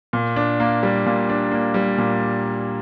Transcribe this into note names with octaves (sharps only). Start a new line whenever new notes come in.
A#2
D4
A#3
G3
A#2
D4
A#3
G3
A#2